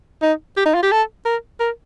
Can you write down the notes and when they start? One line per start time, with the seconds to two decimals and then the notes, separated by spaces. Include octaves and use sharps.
0.22 D#4
0.57 G4
0.66 D#4
0.75 F4
0.83 G4
0.91 A4
1.25 A#4
1.60 A#4